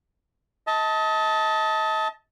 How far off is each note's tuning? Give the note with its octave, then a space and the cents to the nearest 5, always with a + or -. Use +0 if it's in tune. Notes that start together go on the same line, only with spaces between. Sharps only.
D#5 +35 A5 +0